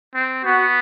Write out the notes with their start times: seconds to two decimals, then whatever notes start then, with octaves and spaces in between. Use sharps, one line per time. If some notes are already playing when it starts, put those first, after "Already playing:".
0.15 C4
0.45 B3 F#4